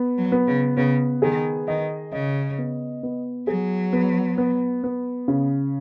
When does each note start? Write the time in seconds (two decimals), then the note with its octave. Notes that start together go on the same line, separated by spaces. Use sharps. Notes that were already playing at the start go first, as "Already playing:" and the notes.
Already playing: B3
0.18 F#3
0.32 B3
0.47 C#3
0.77 C#3 B3
1.22 D#3 G#4
1.68 D#3 D#5
2.12 C#3 D#5
2.58 B3
3.03 B3
3.47 F#3 G#4
3.93 B3
4.38 B3
4.83 B3
5.28 C#3